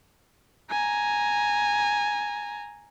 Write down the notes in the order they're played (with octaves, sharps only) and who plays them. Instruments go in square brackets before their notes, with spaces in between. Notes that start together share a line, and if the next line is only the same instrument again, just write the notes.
[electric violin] G#5 A#5